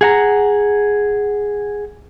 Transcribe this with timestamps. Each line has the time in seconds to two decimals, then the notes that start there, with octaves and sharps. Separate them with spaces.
0.01 G#4 F#5 A#5